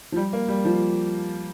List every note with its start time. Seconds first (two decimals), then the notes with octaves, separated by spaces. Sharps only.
0.12 F3
0.16 G3
0.33 A#3
0.48 G3
0.65 F3